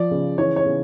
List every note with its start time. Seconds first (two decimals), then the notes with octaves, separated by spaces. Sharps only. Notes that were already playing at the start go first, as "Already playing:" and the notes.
Already playing: F3 D5
0.11 C#3
0.38 E3 C#5
0.56 C#5
0.66 C#3